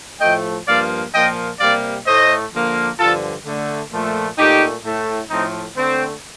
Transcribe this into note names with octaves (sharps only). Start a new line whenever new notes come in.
A2 F3 A3 D#5 G5
G2 F3 A#3 D5 F5
A#2 F3 A#3 D#5 G5
C3 G3 A#3 D5 F5
A2 A3 C5 D#5
D3 F3 A#3
G2 D3 F3 F4 A4
D3 A3
A#2 F3 A3
A#2 A3 D#4 G4
A2 A3
A2 F3 A3 C4 D#4
D3 A3 C4